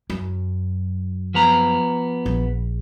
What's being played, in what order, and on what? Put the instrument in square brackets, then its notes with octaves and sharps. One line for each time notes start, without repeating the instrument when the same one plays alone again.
[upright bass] F#2
[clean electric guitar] F3 B3 A#5
[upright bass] A#1